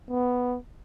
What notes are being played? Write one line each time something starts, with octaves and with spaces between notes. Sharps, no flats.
B3